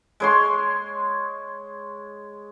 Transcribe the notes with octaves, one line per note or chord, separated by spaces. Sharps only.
G#3 C#5 C6